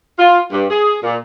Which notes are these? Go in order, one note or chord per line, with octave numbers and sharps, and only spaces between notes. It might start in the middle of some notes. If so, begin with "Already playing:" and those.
F4
G2
G#4
A#2